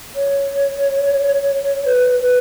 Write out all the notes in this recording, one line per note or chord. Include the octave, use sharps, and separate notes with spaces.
C#5
B4
B4